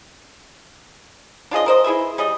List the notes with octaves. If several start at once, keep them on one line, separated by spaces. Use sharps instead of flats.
D4 F4 G#4 D#5
A#4 C5 D#5
E4 G#4 B4 E5
G3 G#4 D#5